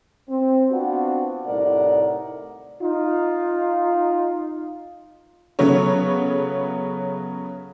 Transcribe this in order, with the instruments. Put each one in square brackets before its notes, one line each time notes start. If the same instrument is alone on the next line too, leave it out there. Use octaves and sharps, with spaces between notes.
[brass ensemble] C4
B3 C4 D4 F4 F#4
C2 A2 D#4 A#4 D5 F#5
[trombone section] D#4 F4
[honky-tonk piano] C#3 F#3 A3 B3 C#5